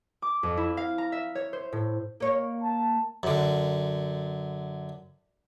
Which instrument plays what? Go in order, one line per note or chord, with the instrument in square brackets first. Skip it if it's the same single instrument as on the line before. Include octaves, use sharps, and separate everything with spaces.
[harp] D6
F2
E4
F5
A#5
E5
C#5
C5
A2
[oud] A#3 C#5
[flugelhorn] A5
[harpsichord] F#2 D3